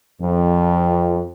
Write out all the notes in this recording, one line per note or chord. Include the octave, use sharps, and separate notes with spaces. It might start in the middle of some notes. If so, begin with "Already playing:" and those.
F2